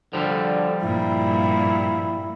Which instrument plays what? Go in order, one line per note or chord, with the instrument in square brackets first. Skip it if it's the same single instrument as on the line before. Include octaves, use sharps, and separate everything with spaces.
[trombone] D3 [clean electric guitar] F3 G3
[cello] G2 A#2 [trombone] E4